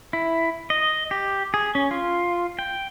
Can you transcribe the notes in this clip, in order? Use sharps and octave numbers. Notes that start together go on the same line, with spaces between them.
E4
D#5
G4
G#4
C#4
F4
G5